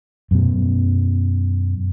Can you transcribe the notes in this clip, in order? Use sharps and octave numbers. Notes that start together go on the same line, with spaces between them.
F#2 B2